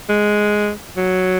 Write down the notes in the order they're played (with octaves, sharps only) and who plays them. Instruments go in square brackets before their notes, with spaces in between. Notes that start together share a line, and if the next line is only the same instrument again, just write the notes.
[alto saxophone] G#3
F#3